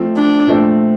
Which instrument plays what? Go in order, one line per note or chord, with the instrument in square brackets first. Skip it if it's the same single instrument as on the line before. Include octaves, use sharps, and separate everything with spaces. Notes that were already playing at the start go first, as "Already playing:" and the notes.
Already playing: [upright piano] F3 A3 C4
[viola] D4
[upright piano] A#2 F3 A3 C4